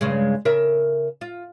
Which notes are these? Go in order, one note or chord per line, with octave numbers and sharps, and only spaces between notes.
G2 C#3 G#3
C#3 A#4 E5
F4